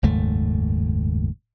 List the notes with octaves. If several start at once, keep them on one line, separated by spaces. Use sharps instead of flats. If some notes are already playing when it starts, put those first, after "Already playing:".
F#1 D#2 G#2 A3